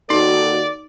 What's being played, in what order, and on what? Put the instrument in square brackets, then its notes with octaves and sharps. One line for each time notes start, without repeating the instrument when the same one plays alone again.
[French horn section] D#2 F#4 A4 [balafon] D#4 [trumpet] D5